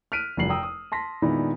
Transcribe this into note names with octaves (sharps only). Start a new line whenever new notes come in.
F6 F#6 B6 D7 D#7
F1 G2 F#4 C7 F#7
G5 A#5 D#6 E6
D#6
A5 C6 A#6 B6
A#2 D#3 G#3 B3 D4 E4